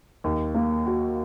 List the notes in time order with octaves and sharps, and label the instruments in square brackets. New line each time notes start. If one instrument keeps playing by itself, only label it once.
[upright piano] D#2
A#3
F#4